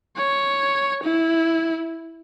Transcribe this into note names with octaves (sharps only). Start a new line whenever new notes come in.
C#5
E4